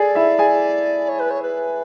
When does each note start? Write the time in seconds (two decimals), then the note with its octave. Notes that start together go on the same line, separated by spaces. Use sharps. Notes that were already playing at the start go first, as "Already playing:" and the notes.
Already playing: G#4 A4 D5 G#5
0.15 E4 E5
0.39 G#4 G#5
1.08 C#5
1.19 B4
1.30 C#5
1.42 B4